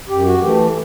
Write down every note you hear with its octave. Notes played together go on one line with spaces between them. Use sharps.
F#2 G4
F#4
E3 A3 G4